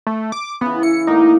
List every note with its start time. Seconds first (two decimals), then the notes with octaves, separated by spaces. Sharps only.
0.07 A3
0.32 D6
0.61 C#3 E3 B3
0.83 E4 C#7
1.07 A2 A#3 D#4 D6